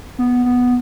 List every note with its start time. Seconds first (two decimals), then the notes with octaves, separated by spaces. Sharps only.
0.19 B3
0.45 B3